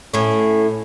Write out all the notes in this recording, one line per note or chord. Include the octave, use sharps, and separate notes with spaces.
A2 C#4